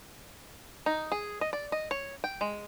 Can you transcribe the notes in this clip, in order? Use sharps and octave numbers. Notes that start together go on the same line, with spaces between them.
D#4
G#4
D#5
D5
D#5
C#5
G5
G#3